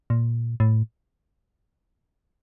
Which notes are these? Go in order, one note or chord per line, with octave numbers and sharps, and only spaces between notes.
A#2
A2